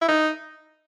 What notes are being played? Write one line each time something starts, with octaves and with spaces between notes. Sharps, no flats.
E4
D#4